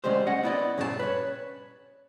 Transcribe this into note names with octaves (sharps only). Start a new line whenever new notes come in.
D2 C#3 G3 G#3 C5
C#4 D#5 F#5
B3 E4 D5 D#5
G2 A#2 C#3 G3 A#4 A5
B4 C#5